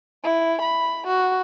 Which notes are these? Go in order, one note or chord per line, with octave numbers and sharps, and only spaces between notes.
E4
B5
F#4